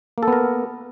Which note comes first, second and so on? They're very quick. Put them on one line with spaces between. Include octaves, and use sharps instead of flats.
A#3 A4 B3 A#4